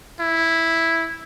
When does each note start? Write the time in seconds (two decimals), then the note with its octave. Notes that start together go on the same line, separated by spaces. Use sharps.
0.20 E4